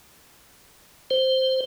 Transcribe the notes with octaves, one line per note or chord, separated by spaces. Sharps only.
C5